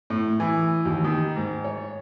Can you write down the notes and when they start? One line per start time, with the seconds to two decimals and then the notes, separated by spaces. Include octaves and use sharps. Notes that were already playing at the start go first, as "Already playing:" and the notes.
0.10 A2
0.40 E3
0.85 D#2
1.04 D#3
1.36 G#2
1.64 C#5